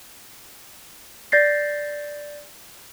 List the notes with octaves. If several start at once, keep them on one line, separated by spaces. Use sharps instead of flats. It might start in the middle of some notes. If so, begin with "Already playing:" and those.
D5 G6 A6 A#6 C7